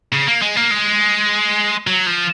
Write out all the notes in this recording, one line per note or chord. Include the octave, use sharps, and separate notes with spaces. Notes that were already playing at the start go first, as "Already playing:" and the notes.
C#3
A#3
G#3
A#3
G#3
F#3
F3